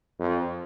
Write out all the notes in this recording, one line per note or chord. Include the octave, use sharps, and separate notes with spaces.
F2